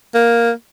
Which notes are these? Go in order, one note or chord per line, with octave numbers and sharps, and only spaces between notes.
A#3